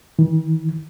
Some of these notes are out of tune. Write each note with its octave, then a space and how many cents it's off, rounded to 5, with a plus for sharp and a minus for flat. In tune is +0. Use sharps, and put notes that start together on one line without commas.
E3 -45